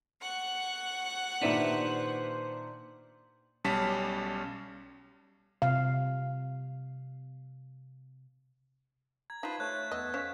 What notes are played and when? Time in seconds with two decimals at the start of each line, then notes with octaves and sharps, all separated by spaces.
0.21 F#5 C#6 F#6
1.42 A#2 D#3 D4 G4 B4 C5 E5
3.64 B1 G3 C#4 A5 B6
5.62 C3 F5
9.30 A#5 G#6
9.43 D#4 F4 B4 C5 F5 A5
9.60 A3 C#5 F#6
9.91 E2 B3 D#5 E6
10.14 C#4 C5 C#5 F5 B6